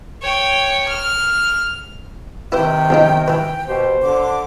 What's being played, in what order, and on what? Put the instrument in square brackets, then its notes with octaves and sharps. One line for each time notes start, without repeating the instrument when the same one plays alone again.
[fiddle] C#5 G5
F6
[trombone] C3 [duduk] D#3 [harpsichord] E4 B4 C5 [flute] G5
[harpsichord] E2 F3 D#4
[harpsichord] E3 B4 [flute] G5
[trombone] B2 [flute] G4 [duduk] C5
[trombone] D3 [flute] D6